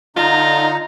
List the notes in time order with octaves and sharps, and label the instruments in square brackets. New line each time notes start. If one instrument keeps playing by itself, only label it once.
[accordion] D3 D#4 [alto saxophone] F4 [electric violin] A#5